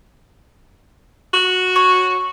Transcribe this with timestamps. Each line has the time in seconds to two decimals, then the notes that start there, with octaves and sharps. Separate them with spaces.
1.33 F#4
1.76 C#5